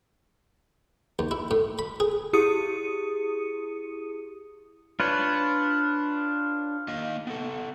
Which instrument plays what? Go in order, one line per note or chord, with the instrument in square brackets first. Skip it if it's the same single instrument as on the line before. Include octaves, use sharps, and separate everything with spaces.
[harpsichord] D#2
E4
A2
B5
G#4
[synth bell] E4 G4 G#4 D#6 C#7 D#7
[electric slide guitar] D4 [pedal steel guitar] F4 B4 C#5
[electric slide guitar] A#3 D#5 F5
B3 A4